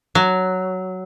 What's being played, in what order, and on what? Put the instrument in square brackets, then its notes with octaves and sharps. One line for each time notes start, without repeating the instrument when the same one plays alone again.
[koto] F#3